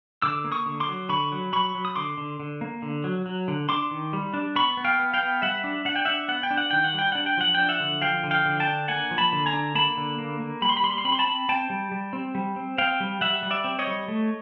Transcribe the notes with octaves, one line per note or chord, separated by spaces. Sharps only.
D3 D6 E6
A#3
C#6 D#6
D3
C6 D6
F#3
D3 B5 C#6
F#3
F#3 B5 C#6
F#3
D#6
D3 C6 D6
D3
D3
A#3
D3
F#3
F#3
D3
D4 C6 D6
D#3
G3
D4
B3 B5 C#6
B3
F5 G5
B3
F5 G5
B3
G3 E5 F#5
D4
D4 F#5
G5
D4 E5 F#5
B3 F#5
G5
D4
F#5
D#3 G5
F#5
G3 G5
D4 F#5
G5
F3 F#5
D4 G5
E5 F#5
D3
F3 F5 G5
D3
F5 G5
D3
G5 A5
D4
A#3 F#5 G#5
F3
A5 B5
D3
G#5 A#5
D4
A#3 A5 B5
D3
A#3
A#3
G3 B5
C6
B5
G3 C6
B5
C6
C4 B5
C6
A5 B5
C4
C4 G5 A5
G3
G3
C4
G3
C4
C4 F5 G5
G3
G3 E5 F#5
G3
D5 E5
C4
C#5 D#5
G3
A3